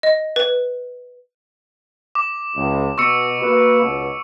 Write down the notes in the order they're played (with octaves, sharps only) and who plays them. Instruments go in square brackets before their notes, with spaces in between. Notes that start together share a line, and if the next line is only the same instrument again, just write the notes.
[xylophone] D#5
B4
[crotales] D6
[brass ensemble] C#2
[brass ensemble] B2 [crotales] C#6 E6 C#7
[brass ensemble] A#3 F#4 B4
C#2 B2